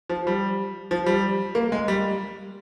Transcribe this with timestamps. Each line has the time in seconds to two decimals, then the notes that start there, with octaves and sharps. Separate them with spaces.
0.09 F3
0.27 G3
0.91 F3
1.06 G3
1.55 A#3
1.72 G#3
1.88 G3